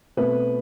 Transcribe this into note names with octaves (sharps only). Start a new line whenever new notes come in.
B2 A3 B3 C4 B4